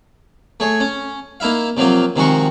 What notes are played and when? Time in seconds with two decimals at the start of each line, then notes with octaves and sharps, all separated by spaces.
0.60 A3 G#4 C#5
0.80 C#4
1.40 A#3 D#4 E4 E5 F5
1.77 C3 F3 F#3 A#3 F4
2.16 C3 D#3 F3 G#3 F#4 C#6